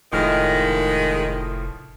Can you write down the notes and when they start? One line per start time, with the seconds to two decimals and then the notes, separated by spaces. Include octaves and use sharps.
0.13 F1 A2 D#3 F3 G#3 F6